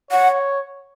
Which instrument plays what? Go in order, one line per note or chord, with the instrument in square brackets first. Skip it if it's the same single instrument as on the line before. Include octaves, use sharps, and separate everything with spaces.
[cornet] C#5 [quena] F#5